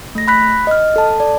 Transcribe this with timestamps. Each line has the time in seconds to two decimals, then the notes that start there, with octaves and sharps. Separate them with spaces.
0.15 A3 A#6
0.28 B5 F#6 B6
0.67 D#5 F6
0.96 A4 A5
1.20 D5